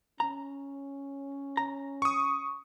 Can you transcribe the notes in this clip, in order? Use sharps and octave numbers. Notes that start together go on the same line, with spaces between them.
C#4 A#5
A#5
C#6 D#6